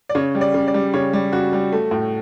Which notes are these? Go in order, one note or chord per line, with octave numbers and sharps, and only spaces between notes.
D5
C#3 C#5
G3
D5
C#3
D5
G3
C#3 C#5
G3
C#3 F#4
G3
A3
A2